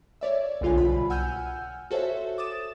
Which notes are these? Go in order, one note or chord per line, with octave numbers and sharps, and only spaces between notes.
C#5 D5 E5
B1 G#2 D3 F4 F5 G#5
C2 B2 B5
F#5 G#5 E6 F6 G6
F#4 A4 C5 C#5 E5
D6 D#6 A6 E7